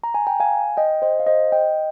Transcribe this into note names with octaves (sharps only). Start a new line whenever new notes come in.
A#5
G#5
G5 A#5
F5 G#5
D#5 G5
C5 D#5
F5
C5 D#5
D#5 G5